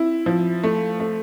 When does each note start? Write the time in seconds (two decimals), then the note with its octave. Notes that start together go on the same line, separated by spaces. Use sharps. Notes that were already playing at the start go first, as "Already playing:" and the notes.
Already playing: C4 E4
0.26 F3
0.64 A3
1.00 A3